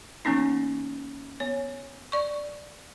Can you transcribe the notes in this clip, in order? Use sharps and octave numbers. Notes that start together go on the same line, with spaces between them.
E3 A#3 B3 C#4 D#4
B3 C#5
D5 C#6